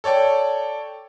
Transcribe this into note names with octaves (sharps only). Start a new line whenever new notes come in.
A4 C#5 D5 G5